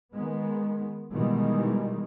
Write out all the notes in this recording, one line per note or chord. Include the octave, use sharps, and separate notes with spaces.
D#3 G#3 B3
B2 D#3 E3 G3 G#3